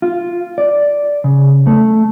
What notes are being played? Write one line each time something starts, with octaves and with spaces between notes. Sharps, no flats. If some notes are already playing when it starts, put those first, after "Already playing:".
F4
D5
C#3
A3